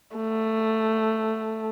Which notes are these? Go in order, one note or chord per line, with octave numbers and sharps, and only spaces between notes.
A3